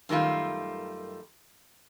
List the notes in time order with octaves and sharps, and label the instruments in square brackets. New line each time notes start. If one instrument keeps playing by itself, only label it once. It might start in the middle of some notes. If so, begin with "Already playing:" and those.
[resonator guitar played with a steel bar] F#2 D#3 G3 A3 F4